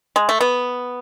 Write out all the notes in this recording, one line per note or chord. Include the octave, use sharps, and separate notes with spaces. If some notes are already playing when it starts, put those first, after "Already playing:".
G#3
A3
B3